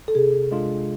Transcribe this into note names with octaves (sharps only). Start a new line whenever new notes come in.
A4
C3 G#4
G#3 D4 F4